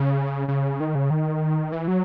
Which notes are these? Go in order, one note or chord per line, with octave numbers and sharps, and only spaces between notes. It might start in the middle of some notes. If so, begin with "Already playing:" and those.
Already playing: C#3
C#3
D#3
C#3
D#3
E3
F#3